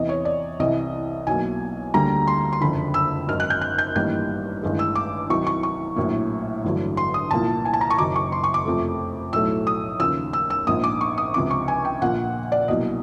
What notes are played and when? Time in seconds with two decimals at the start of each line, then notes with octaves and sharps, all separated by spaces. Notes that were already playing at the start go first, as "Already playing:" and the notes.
Already playing: E2 C3 E3 D#5
0.09 C#5
0.25 D5
0.59 C2 C3 E3 D#5
1.27 B1 B2 F#3 A#3 G#5
1.94 D2 D3 G3 A#3 A#5
2.27 C6
2.53 C6
2.61 F#1 F2 D3 B5
2.94 E6
3.28 G#1 F#2 D#3 F6
3.40 F#6
3.50 G6
3.61 F#6
3.78 G6
3.95 A1 G2 D#3 G3 A#3 G6
4.63 A1 G2 D#3 G#3
4.79 E6
4.95 D6
5.30 C2 C3 D#3 F#3 C#6
5.47 C#6
5.63 C#6
5.96 A#1 A2 F#3 A#3
6.64 A1 G2 D3 F#3
6.97 C6
7.14 D#6
7.31 C2 A#2 F3 A#3 A5
7.65 G#5
7.73 A5
7.81 A#5
7.90 C#6
7.98 F#1 F#2 D#3 F#3 D6
8.16 C#6
8.32 C6
8.44 C#6
8.54 D6
8.65 F2 C3 F3 A3
9.33 B1 A2 F#3 A3 E6
9.67 D#6
9.99 D#2 C#3 F3 E6
10.33 E6
10.50 E6
10.67 A#1 G#2 F3 A#3 D#6
10.84 D6
11.01 C#6
11.18 D#6
11.34 C#2 C3 F3 D6
11.51 C#6
11.68 G#5
11.85 G5
12.02 A#1 A#2 F3 A#3 F#5
12.52 D5
12.68 C2 B2 F#3 A#3 D#5